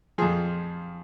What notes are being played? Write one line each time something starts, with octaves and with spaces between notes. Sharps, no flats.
F2 F3 G#4